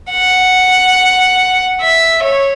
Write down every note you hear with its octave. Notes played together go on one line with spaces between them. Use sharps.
F#5
E5
C#5